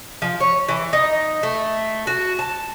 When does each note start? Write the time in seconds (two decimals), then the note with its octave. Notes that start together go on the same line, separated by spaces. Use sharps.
0.22 F3
0.40 C#5
0.69 E3
0.93 D#4
1.43 A3
2.07 F#4
2.39 A5